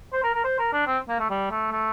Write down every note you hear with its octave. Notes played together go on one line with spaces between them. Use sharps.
C5
A#4
A#4
C5
A#4
D4
C4
A#3
A3
G3
A3
A3